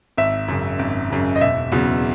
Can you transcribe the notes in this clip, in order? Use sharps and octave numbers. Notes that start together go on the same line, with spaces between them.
G#1 E5
F#2 C#3
G#1
F#2 C#3
D#5
E1 E5
E2 C#3 F#3